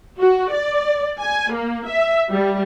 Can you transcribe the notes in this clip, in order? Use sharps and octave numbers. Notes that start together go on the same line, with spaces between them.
F#4
D5
G#5
A#3
E5
G3